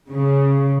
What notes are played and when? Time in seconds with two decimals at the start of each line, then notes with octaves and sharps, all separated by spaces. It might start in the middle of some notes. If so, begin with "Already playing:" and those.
0.10 C#3